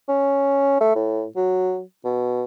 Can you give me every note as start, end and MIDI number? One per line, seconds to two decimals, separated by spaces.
0.08 0.77 61
0.81 0.95 57
0.96 1.26 45
1.36 1.81 54
2.04 2.44 47